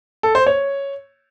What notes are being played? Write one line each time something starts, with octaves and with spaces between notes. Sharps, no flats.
A4
C5
C#5